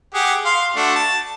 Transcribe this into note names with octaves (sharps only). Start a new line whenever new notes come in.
G4 G#4 F#5
F5 C6
A3 D4 F#4
A5